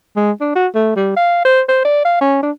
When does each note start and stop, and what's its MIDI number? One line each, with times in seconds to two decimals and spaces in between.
0.16 0.32 56
0.41 0.51 62
0.56 0.67 66
0.75 0.95 57
0.96 1.13 55
1.17 1.45 77
1.45 1.62 72
1.69 1.85 72
1.85 2.00 74
2.05 2.16 77
2.21 2.42 61
2.43 2.51 62